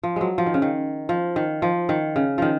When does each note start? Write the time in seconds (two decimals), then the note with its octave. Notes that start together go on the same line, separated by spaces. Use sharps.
0.04 F3
0.16 F#3 G#3
0.38 F3
0.46 D#3
0.54 C#3
0.62 D#3
1.09 F3
1.36 D#3
1.62 F3
1.89 D#3
2.16 C#3
2.38 D#3 F3